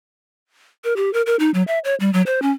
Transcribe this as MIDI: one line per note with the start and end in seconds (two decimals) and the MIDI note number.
0.84 0.94 70
0.96 1.12 67
1.13 1.22 70
1.26 1.36 70
1.39 1.51 63
1.54 1.63 54
1.67 1.79 76
1.84 1.95 73
2.00 2.12 55
2.13 2.22 54
2.26 2.40 72
2.42 2.51 61